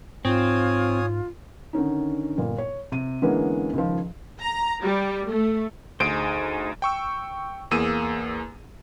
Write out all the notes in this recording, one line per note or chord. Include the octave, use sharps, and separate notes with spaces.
G#2 C4 F4 C#5 G#5 D#6
D3 D#3 C#4 D#4
G1 A#2
C#5
C3 D#7
D3 E3 G#3 A#3 B3 C#4
C#2 D#3 F3
A#5
G3
A3
D2 D#4 G#4 C5 D7
G5 C#6 E6
E2 A#3 G#4 E6 D#7